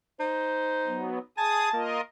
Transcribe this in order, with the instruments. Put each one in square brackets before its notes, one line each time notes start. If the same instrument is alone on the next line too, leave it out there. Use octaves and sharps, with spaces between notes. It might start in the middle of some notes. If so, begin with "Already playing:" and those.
[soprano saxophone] D#4 [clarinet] C5
[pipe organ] F#3 B3
[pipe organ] G#4 D#6 [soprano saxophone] G#5 [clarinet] A5
[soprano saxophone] A#3 [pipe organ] F4 A#4 D#5